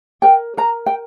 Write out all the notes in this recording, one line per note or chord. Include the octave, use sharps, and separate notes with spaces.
A#4 G5
A#4 A#5
G5